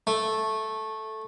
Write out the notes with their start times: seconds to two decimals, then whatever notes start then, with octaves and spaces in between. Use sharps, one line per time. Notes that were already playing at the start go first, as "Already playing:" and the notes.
0.07 A3